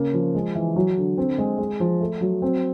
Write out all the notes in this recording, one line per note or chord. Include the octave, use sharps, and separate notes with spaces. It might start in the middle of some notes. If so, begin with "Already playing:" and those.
Already playing: C#3 A#3
F3
G#3
E3
F#3
D3
C4
G#3
G#3
F3
A3
F#3
C4